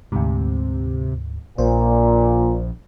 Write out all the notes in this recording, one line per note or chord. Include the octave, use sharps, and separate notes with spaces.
D2 G#2 C3
A#1 A#2 C5